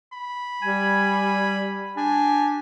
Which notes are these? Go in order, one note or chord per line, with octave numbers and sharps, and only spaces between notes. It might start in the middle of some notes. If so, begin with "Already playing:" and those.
B5
G3 G#5
D4 G4 G#5